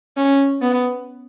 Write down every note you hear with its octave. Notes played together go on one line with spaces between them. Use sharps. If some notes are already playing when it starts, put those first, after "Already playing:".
C#4
B3